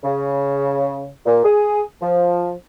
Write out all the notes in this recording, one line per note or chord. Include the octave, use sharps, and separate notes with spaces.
C#3
A#2
G#4
F3